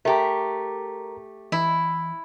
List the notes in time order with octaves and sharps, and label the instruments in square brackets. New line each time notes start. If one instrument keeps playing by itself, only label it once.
[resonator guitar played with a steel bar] A3 G4 [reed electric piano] A#4 A#5
[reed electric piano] E3 [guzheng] E4